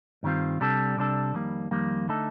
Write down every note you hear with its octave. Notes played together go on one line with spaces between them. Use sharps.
G2 D#3 G3 C4 F4
C2 C3 G3 D4 A4
C2 C3 G3 D4 A4
F2 D#3 G3 A#3
F2 D#3 G3 A#3
D3 A3 D#4 A4